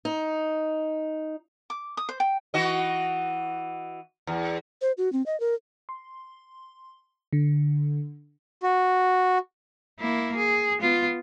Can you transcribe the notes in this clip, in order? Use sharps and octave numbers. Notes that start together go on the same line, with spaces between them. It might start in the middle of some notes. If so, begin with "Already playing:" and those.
D#4
D6
D#6
C5
G5
E3 F#4 D#5
E2
C5
F#4
C4
D#5
A#4
C6
D3
F#4
A#3 E4
G#4
B3 F4